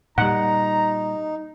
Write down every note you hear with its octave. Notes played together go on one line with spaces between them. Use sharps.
A#2 G3 D#4 F#5 A#5